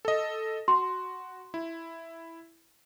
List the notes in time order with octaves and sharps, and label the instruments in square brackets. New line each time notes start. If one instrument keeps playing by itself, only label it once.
[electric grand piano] A4 D#5
[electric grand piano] F#4 [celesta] C6
[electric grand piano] E4